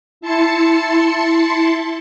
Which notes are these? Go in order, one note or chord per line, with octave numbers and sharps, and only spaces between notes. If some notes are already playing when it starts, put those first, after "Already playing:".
E4 A5 C6 C#7